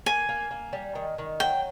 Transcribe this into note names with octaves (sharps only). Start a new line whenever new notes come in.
A#3 G#5
A#3
A#3
G3
D#3
D#3
F#3 G5